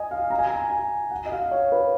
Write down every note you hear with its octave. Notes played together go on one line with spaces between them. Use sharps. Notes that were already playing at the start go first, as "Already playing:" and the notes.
Already playing: D#5 G#5
F5
A#5
G#5
A#5
G#5
F#5
D#5
F5
C#5
B4